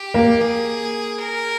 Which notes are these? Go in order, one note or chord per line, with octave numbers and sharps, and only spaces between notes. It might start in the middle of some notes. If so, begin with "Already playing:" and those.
Already playing: G4
A#3
G#4
A#4